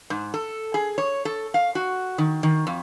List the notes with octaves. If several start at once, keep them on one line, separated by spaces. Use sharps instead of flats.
G#2
A4
G#4
C#5
A4
F5
F#4
D#3
D#3
F2